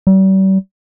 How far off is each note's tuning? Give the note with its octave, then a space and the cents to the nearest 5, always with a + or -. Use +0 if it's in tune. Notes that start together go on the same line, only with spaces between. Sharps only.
G3 -40